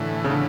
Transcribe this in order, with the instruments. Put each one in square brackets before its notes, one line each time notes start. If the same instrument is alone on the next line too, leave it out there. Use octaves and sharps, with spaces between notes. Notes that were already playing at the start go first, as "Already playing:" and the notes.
Already playing: [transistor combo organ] A2 E3 [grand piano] D3
[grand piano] C#3
[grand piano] D3 [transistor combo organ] E3